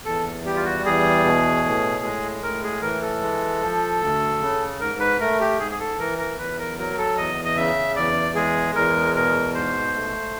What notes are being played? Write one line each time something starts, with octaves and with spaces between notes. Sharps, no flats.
E2 A4
G3 G4
F4
F#4
E2 G#4
B2
A2
G#3
A2 A#4
G#4
E3 A#4
A4
G#3
F3
D2
C#3
G#2 A#4
B4
A3 A#4
G4
G#2 G#4
G#4
A4
E3 A#4
A#4
E2 B4
A#4
F#3 A#4
A4
E2 D#5
D#5
C#3 E5
E2 D5
G#3 G#4
E2 A#4
B2 A#4
G#2 C5
A3